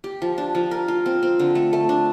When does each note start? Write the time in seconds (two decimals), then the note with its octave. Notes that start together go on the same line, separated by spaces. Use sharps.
0.04 G4
0.22 F3
0.38 D4
0.55 F3
0.71 A#4
0.88 F4
1.06 C4
1.23 C4
1.39 D3
1.55 A3
1.73 A3
1.89 D4